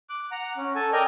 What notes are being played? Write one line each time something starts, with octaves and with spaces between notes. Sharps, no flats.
D6 F#6
F#5 A#5
C#4
A4 G#5 A5
A#4 D5 D#5 G5 G#5 A#5